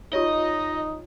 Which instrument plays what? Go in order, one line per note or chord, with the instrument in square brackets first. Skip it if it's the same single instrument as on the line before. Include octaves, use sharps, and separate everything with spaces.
[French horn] D#4 [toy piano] F4 G4 C#5 [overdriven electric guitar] D#5